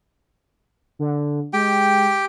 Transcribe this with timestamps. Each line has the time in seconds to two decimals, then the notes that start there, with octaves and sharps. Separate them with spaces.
0.99 D3
1.53 G#3 G4 G5